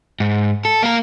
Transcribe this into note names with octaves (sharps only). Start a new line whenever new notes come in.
G#2
A4
A#3 A#4